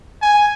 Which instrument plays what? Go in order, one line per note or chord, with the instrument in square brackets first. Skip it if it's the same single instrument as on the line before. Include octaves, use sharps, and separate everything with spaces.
[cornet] G#5